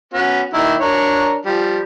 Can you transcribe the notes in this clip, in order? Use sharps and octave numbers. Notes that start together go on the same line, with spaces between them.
B3 C#4 F#4
D#3 A#3 E4
D4 A#4 C#5
F3 G3